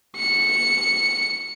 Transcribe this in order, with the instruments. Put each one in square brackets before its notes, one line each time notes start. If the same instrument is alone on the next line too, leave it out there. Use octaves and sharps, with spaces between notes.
[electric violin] C#7